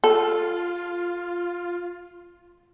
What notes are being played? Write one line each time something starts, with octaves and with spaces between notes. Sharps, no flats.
F4 A4